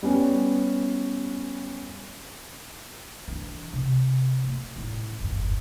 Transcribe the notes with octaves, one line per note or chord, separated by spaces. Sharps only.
G3 B3 C#4
E3 D4
C3
A#3
D#1 A2
G1 E2